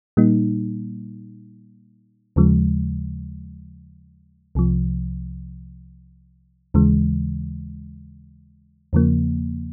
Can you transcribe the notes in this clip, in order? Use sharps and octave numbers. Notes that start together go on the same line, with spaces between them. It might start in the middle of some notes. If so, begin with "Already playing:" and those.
A#2 G3 A#3 D#4
D#2 C#3 F3 G#3
C2 C3 F3
D#2 C#3 E3 G#3
E2 C#3 F3 A#3